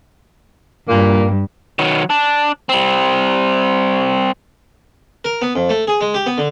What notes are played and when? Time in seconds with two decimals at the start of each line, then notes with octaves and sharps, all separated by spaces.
0.88 G2 A#2 A#3
1.79 D#3 F#3
2.10 D4
2.69 G3 C4
5.25 A#4
5.42 B3
5.55 F2
5.69 A3
5.87 G#4
6.01 G#3
6.14 G4
6.26 B3
6.38 D3